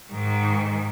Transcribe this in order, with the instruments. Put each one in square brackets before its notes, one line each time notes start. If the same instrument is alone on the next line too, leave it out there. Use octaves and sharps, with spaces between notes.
[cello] G#2 D#3